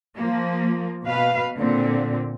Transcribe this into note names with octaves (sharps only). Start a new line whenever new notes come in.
F3 A#3
B2 B4 F5
A#2 D3 C4